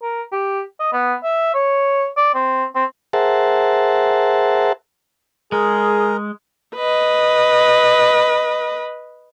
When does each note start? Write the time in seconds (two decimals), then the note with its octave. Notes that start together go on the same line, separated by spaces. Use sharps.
0.03 A#4
0.32 G4
0.79 D#5
0.92 B3
1.24 E5
1.54 C#5
2.17 D5
2.34 C4
2.75 C4
3.13 G#4 A#4 C5 E5 F#5 A5
5.52 G#3 G#4 A#4
6.76 B4 D#5